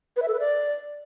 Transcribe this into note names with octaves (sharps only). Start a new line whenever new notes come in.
B4
E5
A4
B4
D5